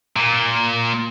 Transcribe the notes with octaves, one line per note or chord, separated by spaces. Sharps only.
A#2